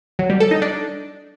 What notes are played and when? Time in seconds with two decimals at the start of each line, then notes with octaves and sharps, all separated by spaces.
0.19 F#3
0.30 G3
0.40 A4
0.51 D#4
0.62 D4